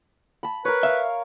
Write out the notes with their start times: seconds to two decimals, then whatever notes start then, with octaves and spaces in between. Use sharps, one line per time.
0.43 A5 B5
0.65 A#4 B4 C#5
0.83 E5 F5